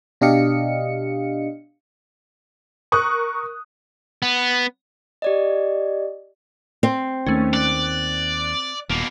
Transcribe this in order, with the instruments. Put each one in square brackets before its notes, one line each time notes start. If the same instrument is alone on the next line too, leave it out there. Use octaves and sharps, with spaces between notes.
[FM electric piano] B2 D4 G4 D#5 F5 C#7
[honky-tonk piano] A#4 C#6 D#6 F#6
[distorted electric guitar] B3
[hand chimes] G4 D5 D#5
[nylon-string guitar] C4
[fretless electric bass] D#2 D#3 [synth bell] A3 C#4
[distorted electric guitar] D5 [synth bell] F#6
[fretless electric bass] D#1 [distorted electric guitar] B2 A#3 [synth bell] D7